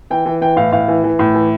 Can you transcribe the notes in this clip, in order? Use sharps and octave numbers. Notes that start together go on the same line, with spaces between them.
E3 G5
E3
E3 G5
A2 F5
A2 F5
E3
E3
A2
E3